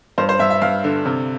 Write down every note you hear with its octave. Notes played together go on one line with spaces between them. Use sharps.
G2 C5
C5
G2 E5
E5
G2 F5
D3
C3